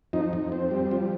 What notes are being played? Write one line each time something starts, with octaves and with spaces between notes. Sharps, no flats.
F2 D#4
F2
C4
G3
F3